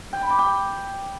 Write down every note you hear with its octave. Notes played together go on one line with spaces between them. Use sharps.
G5
B5
D6
G5